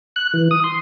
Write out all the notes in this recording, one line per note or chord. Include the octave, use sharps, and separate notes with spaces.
F#6
E3
D#6
C6